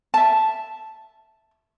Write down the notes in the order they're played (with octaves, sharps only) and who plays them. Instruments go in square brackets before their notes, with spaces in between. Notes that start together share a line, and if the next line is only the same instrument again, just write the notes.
[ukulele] E5 A5